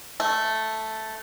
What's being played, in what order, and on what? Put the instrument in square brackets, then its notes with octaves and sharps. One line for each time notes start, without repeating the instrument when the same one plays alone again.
[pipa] A3